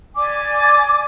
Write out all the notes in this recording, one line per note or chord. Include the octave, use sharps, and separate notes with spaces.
D5 G#5 D6